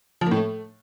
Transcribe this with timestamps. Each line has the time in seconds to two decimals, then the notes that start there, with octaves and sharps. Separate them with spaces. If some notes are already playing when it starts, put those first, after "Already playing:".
0.21 F3
0.26 A#3
0.31 A2
0.36 A3